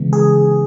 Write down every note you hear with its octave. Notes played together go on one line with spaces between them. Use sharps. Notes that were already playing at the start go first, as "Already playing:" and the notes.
Already playing: C#3 E3 G#3 B3
G#4